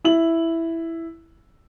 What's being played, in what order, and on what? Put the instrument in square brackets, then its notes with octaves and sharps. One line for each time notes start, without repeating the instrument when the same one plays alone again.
[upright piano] E4 F#7